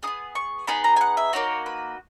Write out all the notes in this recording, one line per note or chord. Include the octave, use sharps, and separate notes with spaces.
B3 D#4 G#4 D#6
C#6
B3 D#4 G#4 B5
A#5
G#5
F#5
E5
A#3 D#4 F#4 C#5
B4